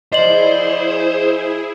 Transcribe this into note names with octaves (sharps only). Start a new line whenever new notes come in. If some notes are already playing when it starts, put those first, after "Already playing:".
F3 E4 G#4 C5 D5 D#5 F#7